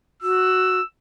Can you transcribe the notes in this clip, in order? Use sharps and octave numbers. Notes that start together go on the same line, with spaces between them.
F#4 E6